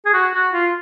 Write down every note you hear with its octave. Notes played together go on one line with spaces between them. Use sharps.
G#4
F#4
F#4
F4